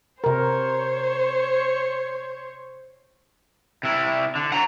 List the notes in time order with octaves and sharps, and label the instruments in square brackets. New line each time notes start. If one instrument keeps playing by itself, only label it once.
[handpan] C3 A#4 [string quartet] C5 C#5
[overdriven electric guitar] C3 E4
D3
F#5 A#5